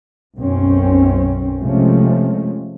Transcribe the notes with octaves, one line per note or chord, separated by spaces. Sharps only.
B1 F#2 C4 C#4
C3 F3 G#3 A3 C#4